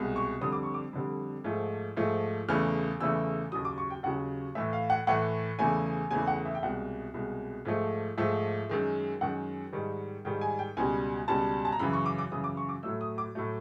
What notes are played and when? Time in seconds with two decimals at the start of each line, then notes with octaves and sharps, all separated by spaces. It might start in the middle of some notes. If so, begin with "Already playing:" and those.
Already playing: C2 B2 G#3
0.16 C#6
0.41 F2 D3 G3 D#6
0.52 D6
0.63 C#6
0.74 D6
0.93 F2 D3 G3
1.44 G#2 F3 A3
1.97 G#2 F3 A3
2.49 E2 C#3 E3 A3 F6
3.00 E2 C#3 E3 A3 E6
3.52 D#2 C#3 F#3 D#6
3.65 D6
3.78 C#6
3.90 G5
4.03 D#2 C#3 F#3 F#5
4.55 A2 E3 A3 E5
4.73 F5
4.90 F#5
5.07 A2 E3 A3 F#5
5.59 E2 C#3 E3 A3 G#5
6.11 E2 C#3 E3 A3 G#5
6.27 F#5
6.45 E5
6.55 G5
6.63 C2 B2 G#3 F#5
7.14 C2 B2 G#3
7.65 G#2 F3 A3
8.18 G#2 F3 A3 E5
8.69 F#2 D#3 G#3
9.21 F#2 D#3 G#3 F#5
9.73 G#2 D#3 G3
10.25 G#2 D#3 G3 G5
10.41 G#5
10.59 G5
10.77 C#2 B2 G3 G#5
11.28 C#2 B2 G3 A5
11.65 A5
11.72 A#5
11.79 F#2 C#3 E3 B5
11.93 C#6
12.06 D6
12.18 D6
12.31 F#2 C#3 E3 D#6
12.44 D6
12.57 C#6
12.69 D6
12.83 A2 F#3 A3 E6
13.01 D#6
13.18 D6
13.35 A2 F#3 A3